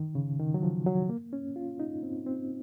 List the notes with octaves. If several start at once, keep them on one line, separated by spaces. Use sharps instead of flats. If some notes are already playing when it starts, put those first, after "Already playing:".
Already playing: D#3
C#3
D#3
F#3
F3
F#3
A#3
C#4
F4
D#4
C4
C4